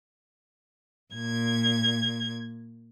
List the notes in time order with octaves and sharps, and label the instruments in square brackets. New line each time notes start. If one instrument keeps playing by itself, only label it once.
[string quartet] A#2 G#6